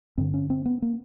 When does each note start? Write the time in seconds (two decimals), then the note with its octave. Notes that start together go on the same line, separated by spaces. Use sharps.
0.18 G2 D3 C4
0.34 C#4
0.50 C4
0.65 B3
0.82 A#3